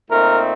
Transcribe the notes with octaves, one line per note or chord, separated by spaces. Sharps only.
A#2 A3 C4 D#4 A#4